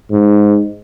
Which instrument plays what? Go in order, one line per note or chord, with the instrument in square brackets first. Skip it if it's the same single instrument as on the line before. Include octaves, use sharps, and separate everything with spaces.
[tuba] G#2